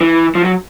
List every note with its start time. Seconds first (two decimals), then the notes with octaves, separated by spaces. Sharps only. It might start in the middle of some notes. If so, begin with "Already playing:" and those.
0.01 E3
0.35 F3
0.44 F#3